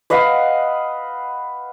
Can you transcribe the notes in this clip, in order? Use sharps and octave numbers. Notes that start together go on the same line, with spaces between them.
B4 D#5 F5 F#5